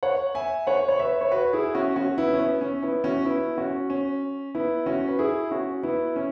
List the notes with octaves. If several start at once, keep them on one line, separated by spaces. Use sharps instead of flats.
C#5 F#5
E5 G#5
C#5 F#5
C#5
B4 E5
C#5
F#4 B4
E4 G#4
C#4 F#4
C#4 F#4
B3 E4
C#4
B3
C#4
B3 E4
C#4 F#4
B3 E4
C#4 F#4
C#4
B3 E4
C#4 F#4
B4
E4 G#4
C#4 F#4
B3 E4
C#4